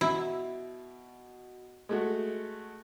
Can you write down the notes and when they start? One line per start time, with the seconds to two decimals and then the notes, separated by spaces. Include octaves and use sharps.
0.01 B2 E4
1.89 G#3 A3 F#4